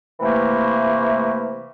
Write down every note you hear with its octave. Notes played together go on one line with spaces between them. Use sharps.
C3 E3 A3 A#3